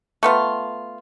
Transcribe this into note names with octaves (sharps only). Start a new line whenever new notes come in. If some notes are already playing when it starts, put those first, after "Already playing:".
A3 B3 F4